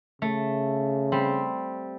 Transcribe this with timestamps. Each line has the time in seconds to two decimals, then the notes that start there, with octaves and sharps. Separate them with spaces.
0.22 C#3 A3
1.12 G3 C4